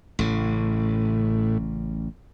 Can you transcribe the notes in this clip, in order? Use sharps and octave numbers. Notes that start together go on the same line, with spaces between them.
A1 A2 C#3